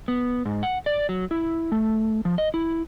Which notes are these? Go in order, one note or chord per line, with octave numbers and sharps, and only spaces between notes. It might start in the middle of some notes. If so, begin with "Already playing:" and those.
B3
G#2
F#5
D5
F#3
E4
A3
F3
D#5
E4